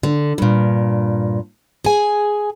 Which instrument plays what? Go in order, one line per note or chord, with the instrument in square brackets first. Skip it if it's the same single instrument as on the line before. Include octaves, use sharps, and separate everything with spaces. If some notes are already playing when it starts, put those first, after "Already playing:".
[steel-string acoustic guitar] D3
G2 A#2
G#4 G#5